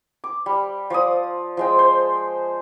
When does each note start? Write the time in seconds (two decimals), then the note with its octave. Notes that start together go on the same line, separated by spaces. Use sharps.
0.24 D6
0.46 G3
0.90 F3 D5 D#6
1.57 F3 G#3 G5
1.79 C5